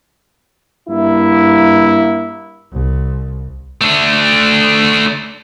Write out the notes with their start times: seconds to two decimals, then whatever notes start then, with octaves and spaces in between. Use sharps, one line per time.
0.89 G2 A#3 E4
2.72 C2
3.81 A3 D4